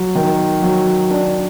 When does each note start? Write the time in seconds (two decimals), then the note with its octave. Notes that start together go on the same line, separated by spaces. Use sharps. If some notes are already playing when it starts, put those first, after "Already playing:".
Already playing: F#3
0.15 D#3
0.62 F#3
1.11 D4